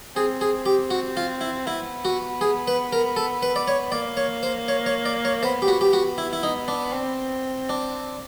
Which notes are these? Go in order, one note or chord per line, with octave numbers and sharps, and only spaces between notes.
C4 G#4
G#4
G4
F#4
F4
E4
B3 E4
F#4
G#4
B4
A#4
A4
B4
D5
C#5
A#3 D5
C#5
C5
C#5
C#5
D5
C#5
B3 C5
G4
F#4
G4
F#4
E4
E4
D#4
D4
C4
D4